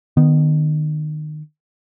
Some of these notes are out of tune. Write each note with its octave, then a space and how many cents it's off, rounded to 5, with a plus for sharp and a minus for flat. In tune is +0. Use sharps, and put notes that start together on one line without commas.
D#3 -30 B3 +0